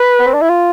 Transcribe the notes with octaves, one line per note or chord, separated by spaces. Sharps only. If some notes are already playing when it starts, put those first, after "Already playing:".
Already playing: B4
B3
C4
D4
E4
F4